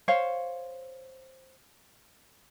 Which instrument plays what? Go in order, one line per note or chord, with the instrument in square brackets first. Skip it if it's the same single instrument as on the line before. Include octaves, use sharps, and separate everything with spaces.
[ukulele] C5 C#5 F5